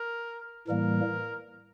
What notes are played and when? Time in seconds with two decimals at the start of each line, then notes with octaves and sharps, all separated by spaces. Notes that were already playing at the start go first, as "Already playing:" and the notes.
Already playing: A#4
0.67 A2 E3 G3 A#3 A#4